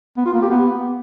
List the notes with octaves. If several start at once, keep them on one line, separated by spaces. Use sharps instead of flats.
B3
F4
A#3
G4
B3